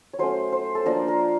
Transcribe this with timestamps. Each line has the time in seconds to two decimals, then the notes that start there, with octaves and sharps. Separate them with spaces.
0.13 C#5
0.19 F#3 A3 C#4 C5
0.52 C5
0.75 A4
0.85 F3 A#3 D4 F4 A#4
1.08 A#4